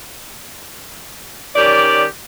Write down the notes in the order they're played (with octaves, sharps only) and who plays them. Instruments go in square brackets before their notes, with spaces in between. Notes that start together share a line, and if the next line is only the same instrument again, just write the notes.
[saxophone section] D#3 C#4 G4 D5